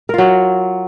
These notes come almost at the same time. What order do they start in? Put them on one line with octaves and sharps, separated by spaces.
A#4 F4 F#3